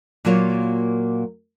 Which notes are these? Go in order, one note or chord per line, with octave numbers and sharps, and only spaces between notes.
A#2 F#3 A#3 F4 C#5